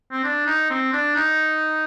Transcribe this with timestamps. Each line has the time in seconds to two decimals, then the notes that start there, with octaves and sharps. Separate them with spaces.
0.12 C4
0.24 D4
0.47 D#4
0.70 C4
0.93 D4
1.16 D#4